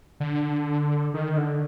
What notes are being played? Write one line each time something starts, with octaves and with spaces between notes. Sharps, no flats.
D3
D#3
D3